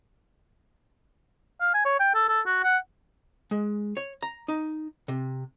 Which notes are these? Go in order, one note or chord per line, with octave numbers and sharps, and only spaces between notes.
F5
G#5
C#5
G5
A4
A4
F#4
F#5
G#3
C#5
A#5
D#4
C3